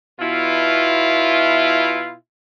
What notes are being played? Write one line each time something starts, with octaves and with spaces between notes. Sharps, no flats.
B2 E4 F4